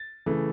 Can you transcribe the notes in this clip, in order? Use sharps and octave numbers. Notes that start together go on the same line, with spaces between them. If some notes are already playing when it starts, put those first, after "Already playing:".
Already playing: A6
C#3 E3 A3